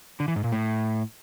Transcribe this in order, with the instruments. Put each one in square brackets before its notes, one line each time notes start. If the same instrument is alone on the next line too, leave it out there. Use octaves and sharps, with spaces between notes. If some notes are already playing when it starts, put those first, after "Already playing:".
[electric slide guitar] D3
E3
G#2
A#2
A2